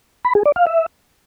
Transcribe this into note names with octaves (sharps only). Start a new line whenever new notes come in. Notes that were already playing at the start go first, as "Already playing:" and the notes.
B5
G#4
D5
F5
E5